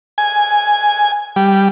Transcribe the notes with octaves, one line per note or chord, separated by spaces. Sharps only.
G#5
G3